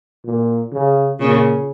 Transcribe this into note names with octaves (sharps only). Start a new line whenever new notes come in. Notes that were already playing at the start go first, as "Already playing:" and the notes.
A#2
C#3
A#2 C#3